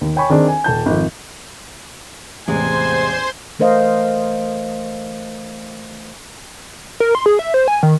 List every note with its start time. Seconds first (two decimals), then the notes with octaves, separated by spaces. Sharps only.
0.01 D#2
0.16 C#5 G5 G#5 B5 C#6
0.30 D#3 C4 D4 G#4
0.48 G#5
0.64 D#1 A5 G6
0.86 G#1 F2
2.48 A1 E2 C3 G#3 C5 G#5 C6
3.59 E3 A3 A#4 C5 D#5 F5
7.00 A#4
7.15 C6
7.26 G#4
7.39 E5
7.54 C5
7.68 G#5
7.83 D#3